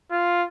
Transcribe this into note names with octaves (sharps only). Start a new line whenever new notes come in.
F4